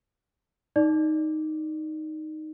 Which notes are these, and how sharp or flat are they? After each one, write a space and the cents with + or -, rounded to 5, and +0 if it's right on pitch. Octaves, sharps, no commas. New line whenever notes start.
D#4 +0 D5 +0